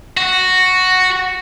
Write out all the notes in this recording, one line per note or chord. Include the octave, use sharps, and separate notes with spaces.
F#4